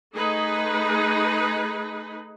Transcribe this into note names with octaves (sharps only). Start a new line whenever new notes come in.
A3 D#4 G#4 B4